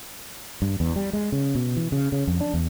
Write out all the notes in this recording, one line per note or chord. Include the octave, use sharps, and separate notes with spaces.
G2
E2
G3
G#3
C#3
B2
E3
C#3
C#3
F2
D4
E2